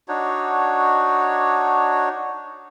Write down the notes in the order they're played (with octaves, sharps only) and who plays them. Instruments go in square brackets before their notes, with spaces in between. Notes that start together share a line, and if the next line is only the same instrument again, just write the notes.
[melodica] D4 D#4 F#4 C#5